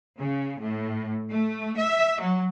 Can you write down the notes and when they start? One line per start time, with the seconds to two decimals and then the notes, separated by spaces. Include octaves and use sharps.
0.18 C#3
0.59 A2
1.30 A3
1.77 E5
2.20 F#3